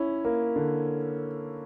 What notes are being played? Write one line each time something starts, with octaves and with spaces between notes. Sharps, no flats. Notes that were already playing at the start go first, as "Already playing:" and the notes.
Already playing: C#4 E4
A#3
D3